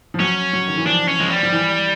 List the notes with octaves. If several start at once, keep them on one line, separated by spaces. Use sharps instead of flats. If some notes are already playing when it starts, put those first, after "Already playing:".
F3
F#3 C#4
F#3
D#3
E3
F3 D4
C#4
F3 G#3
G3
F3
E3